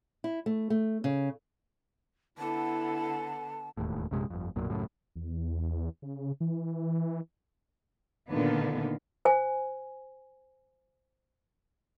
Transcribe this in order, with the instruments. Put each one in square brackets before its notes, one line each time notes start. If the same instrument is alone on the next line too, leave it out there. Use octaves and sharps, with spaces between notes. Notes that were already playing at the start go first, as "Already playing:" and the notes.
[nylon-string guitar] E4
A3
A3
C#3
[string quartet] D3 B3 A4 [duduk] E4 [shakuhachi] A5
[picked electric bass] E1 D#2 A2
A#1 F#2 C3 G#3
G1 F2
B1 F#2 A#2
C#2 F#2 A2
[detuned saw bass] E2
C#3
E3
[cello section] A#2 D3 D#3 A#3 B3
[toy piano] C5 G#5